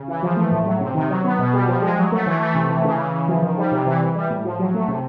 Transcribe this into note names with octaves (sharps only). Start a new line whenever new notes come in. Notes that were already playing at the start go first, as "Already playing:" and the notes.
Already playing: C#3
E3
F3
A3
A2
F#3
C3
D#3
F#3
B3
B2
G3
F3
G#3
F#3
A3
E3
A3
C3
E3
C#3
E3
C#3
F3
D#3
G3
C3
E3
E3
G3
A2
F3
F#3
A3
C3